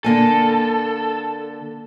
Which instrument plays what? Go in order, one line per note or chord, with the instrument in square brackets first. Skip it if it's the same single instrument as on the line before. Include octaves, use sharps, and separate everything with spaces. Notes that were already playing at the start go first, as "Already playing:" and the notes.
[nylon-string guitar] D3 A#3 G#5 [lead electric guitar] A4